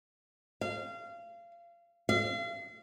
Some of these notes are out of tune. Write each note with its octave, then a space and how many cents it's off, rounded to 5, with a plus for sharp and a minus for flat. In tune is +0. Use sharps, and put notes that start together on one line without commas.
F5 -25
F5 -40